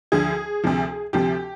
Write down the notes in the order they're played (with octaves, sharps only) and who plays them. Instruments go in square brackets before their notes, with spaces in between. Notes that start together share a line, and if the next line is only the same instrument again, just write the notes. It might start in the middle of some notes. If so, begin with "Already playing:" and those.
[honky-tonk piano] D2 D3 F3 G#4
D2 C3 F3
D2 C3 F3 G4